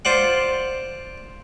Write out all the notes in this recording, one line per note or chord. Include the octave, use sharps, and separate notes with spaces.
F4 C5 D5 F#5